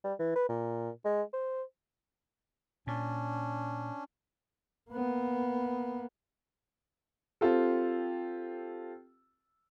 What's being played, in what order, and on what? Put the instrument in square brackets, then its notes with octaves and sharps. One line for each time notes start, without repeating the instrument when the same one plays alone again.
[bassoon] G3
E3
B4
A#2
G#3
C5
[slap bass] A#2 [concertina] C#4 D4
[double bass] A#3 B3
[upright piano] C4 F4 G4 A4